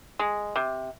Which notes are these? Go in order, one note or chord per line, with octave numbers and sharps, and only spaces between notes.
G#3
C3